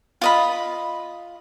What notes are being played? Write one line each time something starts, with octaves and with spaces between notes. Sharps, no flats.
F4 D#5 B5